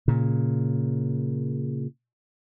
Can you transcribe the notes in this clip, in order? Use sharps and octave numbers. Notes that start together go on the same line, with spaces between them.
A#2 C#3